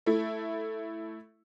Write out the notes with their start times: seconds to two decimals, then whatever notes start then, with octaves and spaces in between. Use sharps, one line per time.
0.06 A3 E4